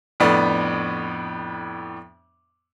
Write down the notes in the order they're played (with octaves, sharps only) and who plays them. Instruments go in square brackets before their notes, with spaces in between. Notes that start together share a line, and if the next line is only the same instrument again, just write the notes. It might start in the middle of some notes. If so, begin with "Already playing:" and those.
[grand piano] F2 A2 B3 D4